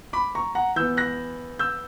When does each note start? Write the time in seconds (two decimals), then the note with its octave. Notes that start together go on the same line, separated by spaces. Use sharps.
0.13 B5 D6
0.35 A#5 C#6
0.55 F#5 A#5
0.76 E3 B3 E6 G6
0.97 F#6 A#6
1.59 E6 G6